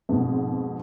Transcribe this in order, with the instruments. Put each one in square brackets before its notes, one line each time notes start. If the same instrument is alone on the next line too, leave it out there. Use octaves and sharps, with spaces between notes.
[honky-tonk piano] F2 G#2 B2